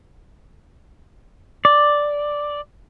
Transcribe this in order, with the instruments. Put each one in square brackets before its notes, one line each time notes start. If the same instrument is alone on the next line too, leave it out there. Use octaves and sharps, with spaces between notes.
[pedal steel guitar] D5